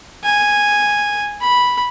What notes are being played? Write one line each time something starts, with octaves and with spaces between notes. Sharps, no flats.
G#5
B5